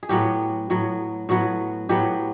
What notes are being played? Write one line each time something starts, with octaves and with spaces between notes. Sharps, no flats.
G#4
A2 F#3 B3 G4
A2 F#3 B3
A2 F#3 B3 F#4
A2 F#3 B3 G4